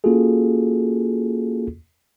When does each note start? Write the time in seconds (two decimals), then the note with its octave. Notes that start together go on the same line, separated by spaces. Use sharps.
0.04 A#3 C#4 F4 F#4 G#4 A4